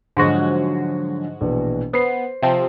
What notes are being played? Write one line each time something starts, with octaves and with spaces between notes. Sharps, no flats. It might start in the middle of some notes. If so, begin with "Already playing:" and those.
G#2 D3 F3 F#3 G#3 F#4
A#1 B2 E3
B3 C5 C7
C3 F3 C4